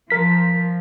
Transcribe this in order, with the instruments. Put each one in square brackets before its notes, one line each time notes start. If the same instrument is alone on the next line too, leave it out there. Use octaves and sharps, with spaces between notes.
[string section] F3 [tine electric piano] A#4 B6